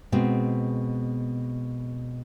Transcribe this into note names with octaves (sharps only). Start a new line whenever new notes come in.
B2 G#3 C4